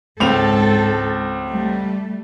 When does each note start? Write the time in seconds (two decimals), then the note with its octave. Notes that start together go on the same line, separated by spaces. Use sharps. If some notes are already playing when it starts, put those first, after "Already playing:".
0.20 C#2 G#2 C4 A4 F7
1.48 G3 A3